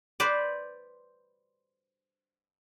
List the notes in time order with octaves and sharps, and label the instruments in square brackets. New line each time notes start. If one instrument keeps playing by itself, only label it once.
[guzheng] B4 C5 D5